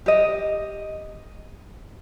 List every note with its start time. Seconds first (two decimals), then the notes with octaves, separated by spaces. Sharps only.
0.06 G4 D#5